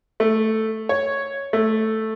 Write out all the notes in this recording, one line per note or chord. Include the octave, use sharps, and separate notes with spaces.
A3
C#5
A3